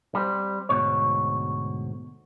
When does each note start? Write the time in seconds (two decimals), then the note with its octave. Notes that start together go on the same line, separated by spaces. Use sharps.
0.15 G3 C4
0.69 D2 G#2 B2 C#5